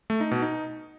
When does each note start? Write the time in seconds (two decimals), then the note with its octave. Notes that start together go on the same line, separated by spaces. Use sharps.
0.10 A3
0.21 D#4
0.31 B2
0.42 D#4